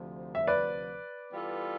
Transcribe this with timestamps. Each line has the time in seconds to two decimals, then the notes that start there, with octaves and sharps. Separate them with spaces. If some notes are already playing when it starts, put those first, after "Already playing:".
Already playing: D2 C3 F3
0.35 E5
0.47 B4 D5
1.32 E3 G3 B3 F4 A4